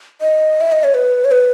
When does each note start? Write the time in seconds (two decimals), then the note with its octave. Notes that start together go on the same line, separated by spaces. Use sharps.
0.21 D#5
0.61 E5
0.72 D#5
0.84 C#5
0.94 B4
1.25 C#5
1.31 B4